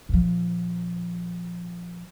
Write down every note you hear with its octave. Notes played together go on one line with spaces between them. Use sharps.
A#2 F3